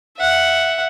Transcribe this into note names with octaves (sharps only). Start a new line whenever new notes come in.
E5 F#5